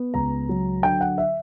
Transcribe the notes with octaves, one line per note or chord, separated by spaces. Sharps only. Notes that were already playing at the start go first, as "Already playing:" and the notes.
Already playing: B3
C#2 A#5
F#3
D3 G5
F#5
E5